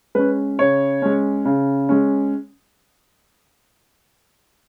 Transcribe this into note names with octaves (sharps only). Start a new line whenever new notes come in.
G#3 C#4 B4
C#3 C#5
G#3 C#4
C#3
G#3 C#4